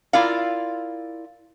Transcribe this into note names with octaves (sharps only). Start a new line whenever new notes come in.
E4 F4 A#4 D5 F5